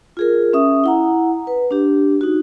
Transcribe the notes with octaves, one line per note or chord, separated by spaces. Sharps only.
F4 G#4 A#4
C#4 E5 D#6
E4 F#5 A#5
B4
D4 G4
D#4 F#4